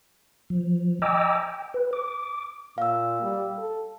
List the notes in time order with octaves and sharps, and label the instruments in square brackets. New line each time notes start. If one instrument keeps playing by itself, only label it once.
[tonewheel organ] F3
D#5 G5 G#5 A#5 D6 E6
G5
B4
D6
[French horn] A#2 [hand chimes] F5 E6
[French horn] G3
A4